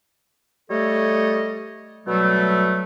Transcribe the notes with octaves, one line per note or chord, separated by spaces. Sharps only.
G3 A3 A4 C#5 D#5
B2 F#3 G3 A3